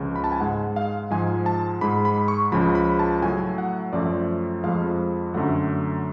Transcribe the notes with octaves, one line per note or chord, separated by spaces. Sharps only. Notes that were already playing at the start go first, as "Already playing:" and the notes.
Already playing: C#2 C#3 F3
B5
A5
G#5
G#2 G#3 F#5
F5
G#2 F3 G#3 G#5
A5
G#2 G#3 B5
B5
C#6
C#2 C#3 F3 B5
B5
A5
A2 F#3 A3 G#5
F#5
F#2 F3 A3 D5
F2 F3 G#3 F5
F#2 D3 F#3 A3 F#5